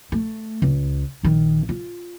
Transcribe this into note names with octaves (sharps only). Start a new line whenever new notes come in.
A3
C#2
A#1 D#3
F4